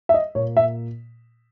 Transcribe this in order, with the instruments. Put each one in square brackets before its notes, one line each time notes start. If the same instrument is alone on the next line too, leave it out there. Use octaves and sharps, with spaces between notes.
[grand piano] E5
D#5
A#2 A#3 C#5
E5